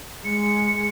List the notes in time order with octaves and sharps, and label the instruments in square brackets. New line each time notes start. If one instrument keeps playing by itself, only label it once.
[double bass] G#3 [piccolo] C#7